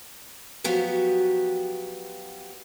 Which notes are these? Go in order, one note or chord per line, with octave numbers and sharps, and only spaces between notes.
F3 F#3 B3 F#4 G4